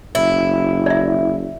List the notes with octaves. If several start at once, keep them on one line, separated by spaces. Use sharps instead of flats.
F#1 E4
D5 E5